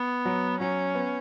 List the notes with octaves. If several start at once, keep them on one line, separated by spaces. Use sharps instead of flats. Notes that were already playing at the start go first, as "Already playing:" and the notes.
Already playing: B3
F#3
F#3 C#4
B3